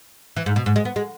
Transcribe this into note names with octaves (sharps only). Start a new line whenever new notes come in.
E3
G#2
B2
G#2
G#3
B3
G#3